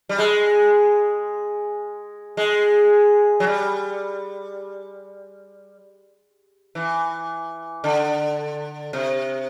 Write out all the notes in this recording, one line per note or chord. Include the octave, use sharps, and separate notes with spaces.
G3
G#3
G#3
F#3
G3
E3
D3
C3